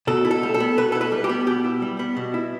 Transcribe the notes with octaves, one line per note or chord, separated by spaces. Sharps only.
B2 A4
E4
A4
G3
A4
B3
B2 B4
A4
E4
B4
G3
G4
B3
B2 G4
E4
G3
B3
B2
E4